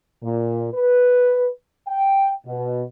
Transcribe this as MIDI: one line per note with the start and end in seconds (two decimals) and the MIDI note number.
0.23 0.69 46
0.74 1.48 71
1.88 2.32 79
2.47 2.84 47